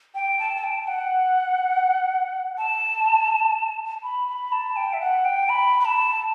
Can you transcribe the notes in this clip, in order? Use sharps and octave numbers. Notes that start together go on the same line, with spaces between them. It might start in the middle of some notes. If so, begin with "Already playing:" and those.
G5
A5
A5
G5
F#5
A5
B5
B5
A5
G5
E5
F#5
G5
B5
B5
A5